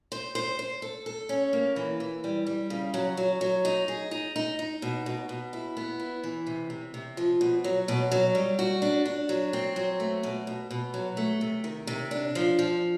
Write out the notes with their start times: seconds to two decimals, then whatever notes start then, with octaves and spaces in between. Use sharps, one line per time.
0.12 C5
0.35 C5
0.59 C5
0.82 A4
1.06 A4
1.29 C#4
1.53 A#3
1.76 E3
2.00 E3
2.24 G3
2.47 G3
2.70 C#3
2.94 F#3
3.17 F#3
3.41 F#3
3.65 D#4
3.88 G#4
4.11 D#4
4.36 D#4
4.59 D#4
4.82 B2
5.06 B2
5.29 B2
5.53 E4
5.77 B3
6.00 E4
6.24 E3
6.47 C3
6.70 C3
6.94 C3
7.17 F3
7.41 B2
7.64 F#3
7.88 B2
8.11 F#3
8.35 G3
8.59 F#4
8.82 D4
9.05 D4
9.29 F#3
9.53 C4
9.76 F#3
10.00 A3
10.23 B2
10.47 B2
10.71 B2
10.94 F#3
11.17 A3
11.41 C3
11.64 D#3
11.87 C3
12.11 D4
12.35 F3
12.59 F3